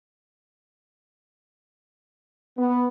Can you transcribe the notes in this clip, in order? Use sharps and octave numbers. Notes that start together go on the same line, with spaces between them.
B3